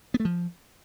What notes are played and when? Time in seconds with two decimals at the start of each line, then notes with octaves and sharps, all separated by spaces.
0.14 B3
0.20 A3
0.25 F3